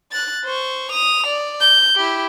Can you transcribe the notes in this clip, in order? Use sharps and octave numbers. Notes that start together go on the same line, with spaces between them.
F#6 A6
C5 C#6
D#6 F7
D5
G6
E4 G4